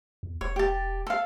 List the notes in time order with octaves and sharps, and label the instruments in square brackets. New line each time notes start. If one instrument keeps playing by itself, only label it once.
[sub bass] E2
[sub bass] E1 [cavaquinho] C#5
[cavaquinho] G4 A5
A4 F5